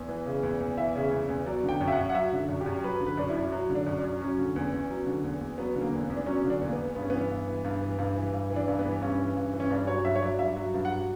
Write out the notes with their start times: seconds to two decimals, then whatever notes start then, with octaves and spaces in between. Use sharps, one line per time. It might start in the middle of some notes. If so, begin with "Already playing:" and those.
Already playing: E2
0.09 E3
0.26 C#3
0.43 E2
0.60 E2
0.78 E3 E5
0.95 C#3
1.11 E2
1.29 E2
1.46 F#3 D5
1.64 D3
1.69 G5
1.81 F#2
1.88 E5
1.92 F#5
1.97 F#2
2.09 F#5
2.15 F#3 E5
2.33 D3
2.49 F#2
2.61 G4
2.66 F#2
2.84 F#3 B4
3.00 D3
3.06 B4
3.17 F#2 D4
3.29 E4
3.36 F#2
3.52 F#3
3.69 D3
3.75 D4
3.87 F#2
3.99 D4
4.04 F#2
4.21 F#3 C#4
4.38 D3
4.56 E2
4.72 E2
4.90 F#3
5.06 D3
5.24 E2
5.41 E2
5.58 F#3 B3
5.75 D3
5.81 A#3
5.93 E2
6.04 B3
6.10 E2
6.17 D4
6.26 F#3 C#4
6.44 D3
6.50 D4
6.61 E2 A#3
6.73 B3
6.79 E2
6.95 G2 B3
7.03 C#4
7.10 E3 B3
7.30 G2
7.48 E3
7.64 G2
7.82 E3
7.98 G2
8.15 E3
8.33 G2
8.50 E3
8.56 D4
8.68 G2
8.79 B3
8.85 E3
9.01 G2 C#4
9.18 E3
9.36 G2
9.54 E3
9.60 C#4
9.71 G2 D4
9.87 F#3 C#5
10.04 G2 E5
10.15 C#5
10.22 F#3 D5
10.39 G2 E5
10.56 F#3
10.74 G2
10.85 F#5
10.91 F#3